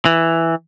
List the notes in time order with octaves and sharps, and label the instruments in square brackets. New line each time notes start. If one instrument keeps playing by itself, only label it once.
[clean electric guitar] E3